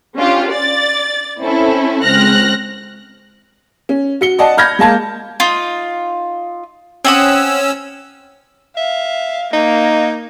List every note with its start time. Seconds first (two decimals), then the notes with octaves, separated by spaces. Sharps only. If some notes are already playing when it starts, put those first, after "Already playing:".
0.16 C#4 D4 F4 G4
0.49 D5 A6
1.40 C4 C#4 E4 A4
2.04 C#2 C4 F6 F#6 A#6
3.89 C#4
4.21 F#4 C#7 G7
4.39 D5 D#5 F#5 A5
4.57 B5 F6 G6 G#6 A#6
4.79 G#3 A#3 A5 G#6
5.40 D#4 F4
7.05 C4 C#4 F#5 D#6 E6
8.77 E5 F5
9.53 A#3 D#4